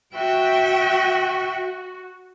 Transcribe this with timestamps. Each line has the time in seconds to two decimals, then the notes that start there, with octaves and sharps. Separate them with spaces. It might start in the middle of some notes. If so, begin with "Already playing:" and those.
0.15 F#4 E5 G5